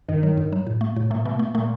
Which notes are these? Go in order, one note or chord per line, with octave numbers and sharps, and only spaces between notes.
G2 D#3
F#3
G2
F#3
A2
A3
A2
A#2 A3
B2 A3
A3
A#2 A3